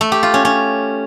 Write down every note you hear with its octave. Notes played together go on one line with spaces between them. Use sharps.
A3
G4
F4
C#4
C#4